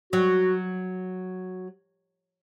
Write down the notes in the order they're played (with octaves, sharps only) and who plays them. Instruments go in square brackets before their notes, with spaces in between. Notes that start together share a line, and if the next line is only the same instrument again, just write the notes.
[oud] F#3 [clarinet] F#4